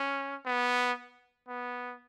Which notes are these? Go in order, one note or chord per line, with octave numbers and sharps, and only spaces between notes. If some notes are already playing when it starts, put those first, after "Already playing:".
Already playing: C#4
B3
B3